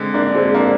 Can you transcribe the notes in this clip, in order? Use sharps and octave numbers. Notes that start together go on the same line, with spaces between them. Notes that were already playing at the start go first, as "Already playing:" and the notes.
Already playing: D3 G#3 C4
A#3 D4
G#3 C4
A#3 D4